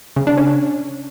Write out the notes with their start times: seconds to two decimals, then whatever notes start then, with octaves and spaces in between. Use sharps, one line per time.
0.16 C#3
0.27 D4
0.37 C#4